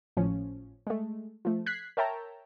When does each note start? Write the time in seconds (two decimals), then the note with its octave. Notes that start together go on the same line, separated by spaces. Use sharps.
0.17 G#1 A2 F3 C#4
0.87 G#3 A3
1.45 F3 A3
1.66 F#6 G#6 B6 C7
1.97 A#4 C#5 E5 G5 A5 A#5